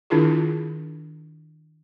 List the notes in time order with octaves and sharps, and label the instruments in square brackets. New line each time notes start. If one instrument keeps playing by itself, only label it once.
[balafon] D#3 D4 E4 F4 G#4